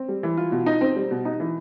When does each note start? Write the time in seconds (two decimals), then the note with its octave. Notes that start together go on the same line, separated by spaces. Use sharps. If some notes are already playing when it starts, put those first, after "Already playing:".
Already playing: C4
0.08 G3
0.23 E3
0.37 F4
0.52 B2
0.66 D#4
0.81 C4
0.96 G3
1.11 B2
1.25 D#4
1.40 E3